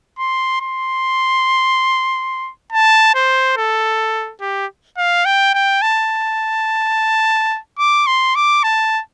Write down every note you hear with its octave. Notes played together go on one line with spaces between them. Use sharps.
C6
C6
A5
C5
A4
G4
F5
G5
G5
A5
D6
C6
D6
A5